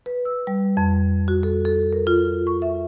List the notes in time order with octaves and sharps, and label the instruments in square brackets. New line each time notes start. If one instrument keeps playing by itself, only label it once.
[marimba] B4
E6
G3
F2
F#4
A4
A4
A#4
F4
C#6
E5